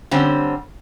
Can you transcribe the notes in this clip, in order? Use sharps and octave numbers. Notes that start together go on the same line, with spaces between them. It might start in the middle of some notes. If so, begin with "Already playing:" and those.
D3 G3 C4 C#4